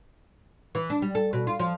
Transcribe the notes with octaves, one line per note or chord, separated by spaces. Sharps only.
E3
D4
G3
A4
B2
F4
F3